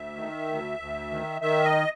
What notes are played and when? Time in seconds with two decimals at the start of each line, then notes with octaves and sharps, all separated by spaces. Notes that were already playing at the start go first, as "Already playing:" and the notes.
Already playing: D2 E5
0.16 D#3
0.48 D2
0.79 D2
1.11 D#3
1.41 D#3 E5
1.65 D#5